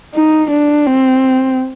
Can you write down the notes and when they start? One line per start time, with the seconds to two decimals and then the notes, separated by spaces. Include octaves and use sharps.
0.14 D#4
0.50 D4
0.86 C4